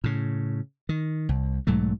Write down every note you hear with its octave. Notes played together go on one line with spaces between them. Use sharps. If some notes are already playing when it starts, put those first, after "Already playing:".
A2 C#3
D#3
C2
B1 G#2 F#3 A3